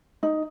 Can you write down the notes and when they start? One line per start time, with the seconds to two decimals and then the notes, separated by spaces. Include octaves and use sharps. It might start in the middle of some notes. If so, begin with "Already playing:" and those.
0.23 D#4